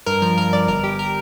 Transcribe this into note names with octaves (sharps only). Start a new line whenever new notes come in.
G2 A#4
F3 A#4
G2 A#4
G2 D5
G1 A#4
G2 G4
A#4